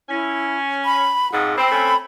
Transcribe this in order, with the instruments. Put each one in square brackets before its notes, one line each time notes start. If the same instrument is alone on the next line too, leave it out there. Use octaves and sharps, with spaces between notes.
[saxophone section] C#4 [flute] E4
[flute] B5
[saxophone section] F2 G#2 [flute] F#5
[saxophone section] C4 [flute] B5
[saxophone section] A3 C4 C#4